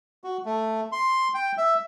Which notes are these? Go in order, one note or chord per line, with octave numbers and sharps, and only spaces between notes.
F#4
A3
C6
G5
E5